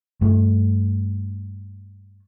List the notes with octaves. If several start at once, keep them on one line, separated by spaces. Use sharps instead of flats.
G2 A3